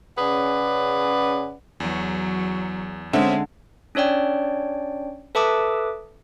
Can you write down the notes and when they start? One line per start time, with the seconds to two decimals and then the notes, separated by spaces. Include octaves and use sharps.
0.18 C#3 C#4 G#4 B4 D5 F#5
1.80 E2 F#3
3.13 D3 G#3 C4 C#4 E5
3.95 C#4 D4 C#5 D5 G5
5.35 A4 B4 E5 A5 D6 D#6